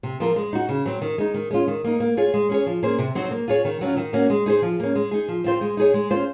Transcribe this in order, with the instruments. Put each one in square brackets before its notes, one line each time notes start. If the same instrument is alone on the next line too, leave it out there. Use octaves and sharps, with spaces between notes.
[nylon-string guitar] C3
F3 C4 F4 A#4
G#3
D#4 F#4
C#3
F#3 C4
D#3
G#3 D#4
D#3
G#3 C#4 F4
D#3
A#3 D#4
A#3
F4 G#4 C#5
G#3
C#4 G#4 C#5
F3
A#3 C#4 G#4 C5
C3
F#3 C4 D#4
A#3
F4 G#4 C#5
D#3
F#3 C#4 F4
D#3
A#3 C#4 F#4
G#3
D#4 G#4 C5
F3
A#3 C#4
G#3
D#4 G#4
F3
C4 F4 C5
G#3
D#4 G#4 C#5
G#3
C#4 F4 C5